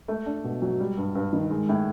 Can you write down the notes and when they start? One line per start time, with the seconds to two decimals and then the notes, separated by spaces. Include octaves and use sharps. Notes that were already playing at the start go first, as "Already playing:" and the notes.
0.08 A3
0.26 D4
0.44 B2
0.62 F#3
0.80 G3
0.97 G2
1.15 G2
1.33 D#3
1.51 G#3
1.69 A2